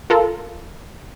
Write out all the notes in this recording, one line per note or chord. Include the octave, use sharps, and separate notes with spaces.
F4 A4 A#4